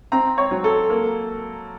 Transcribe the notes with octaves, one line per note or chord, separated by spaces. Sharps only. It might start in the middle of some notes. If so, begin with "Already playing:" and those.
C4 A#5
C#5
F#3
A4
A#3